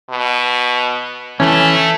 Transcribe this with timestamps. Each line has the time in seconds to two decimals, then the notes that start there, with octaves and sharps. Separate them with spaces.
0.10 B2
1.40 E3 A3 C#4